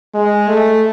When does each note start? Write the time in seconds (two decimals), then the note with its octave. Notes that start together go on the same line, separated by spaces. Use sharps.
0.15 G#3
0.49 A3